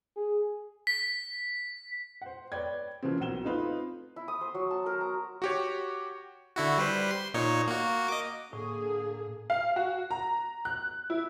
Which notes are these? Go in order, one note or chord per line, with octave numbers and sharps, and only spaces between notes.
G#4
B6
C5 F#5
B4 C#5 D5 G5 G#6
C#3 E3 F3 A#3 C4
B1 F#5 E7 G7
A3 C4 D#4 F4 B4
E4
D#6
C5
F#3
A5
A#4
A#5
F#4 G4 C#5
D3 E4 F#4
G3 B4 C5
C6
A#2 D#4 C#5
A#3 F#4
D#5 D6
A2 D3 A#3 G#4
F5
F#4
A#5
F#6
E4